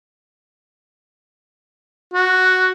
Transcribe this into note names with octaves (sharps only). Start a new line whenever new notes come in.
F#4